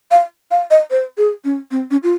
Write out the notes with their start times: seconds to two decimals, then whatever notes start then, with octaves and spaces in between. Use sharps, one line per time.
0.11 F5
0.51 F5
0.71 D#5
0.91 C5
1.18 G#4
1.44 C#4
1.71 C4
1.91 C#4
2.03 F4